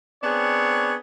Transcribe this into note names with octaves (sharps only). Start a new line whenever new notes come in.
B3 C4 D4 G#4 C#5